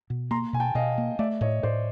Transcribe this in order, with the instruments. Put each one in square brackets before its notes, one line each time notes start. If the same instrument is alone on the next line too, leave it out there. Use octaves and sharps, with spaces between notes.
[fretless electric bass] B2
[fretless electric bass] A#3 [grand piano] A#5 C6
[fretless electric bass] B2 [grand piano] G#5
[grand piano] G5 A5
[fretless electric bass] B2 [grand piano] D#5 F5
[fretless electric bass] A#3
[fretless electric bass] A3 [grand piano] D5 E5
[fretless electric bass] A2 [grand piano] C#5 D#5
[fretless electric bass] A2 [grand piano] C5 D5